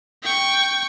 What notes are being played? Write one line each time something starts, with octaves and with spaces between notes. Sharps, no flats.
G5 C#6